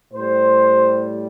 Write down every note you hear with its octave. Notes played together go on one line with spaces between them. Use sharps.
A2 G3 C5